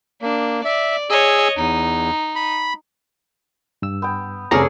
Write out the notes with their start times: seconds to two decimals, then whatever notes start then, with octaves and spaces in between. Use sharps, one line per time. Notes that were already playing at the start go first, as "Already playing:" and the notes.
0.22 A#3 D4
0.65 D5 E5
1.10 G#4 C#5 D#5 E6
1.57 E2 D#4
2.36 B5
3.82 G2 E6
4.02 B3 G5
4.51 F1 C3 C#4 G#4 A4 D5 A#5 F6